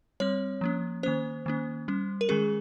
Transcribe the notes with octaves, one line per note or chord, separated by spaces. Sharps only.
G3 C4 C#5
F3 A#3 C#4
D#3 A#3 C#4 C5
D#3 A#3 C#4
G3 C#4
A#4
D#3 G#3 C#4 G#4